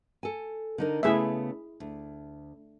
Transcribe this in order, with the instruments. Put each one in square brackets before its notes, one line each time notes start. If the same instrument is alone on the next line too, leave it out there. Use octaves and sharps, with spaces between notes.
[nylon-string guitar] A4 G#5
D3 D#4 A#4
[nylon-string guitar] C#3 A3 B3 [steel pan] E4 G#4 E5
[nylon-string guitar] D2